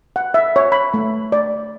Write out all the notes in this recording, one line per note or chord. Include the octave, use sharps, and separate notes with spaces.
F#5
E5
C#5
B5
A3
D5